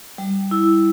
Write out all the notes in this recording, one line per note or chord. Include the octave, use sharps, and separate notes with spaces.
G3
E4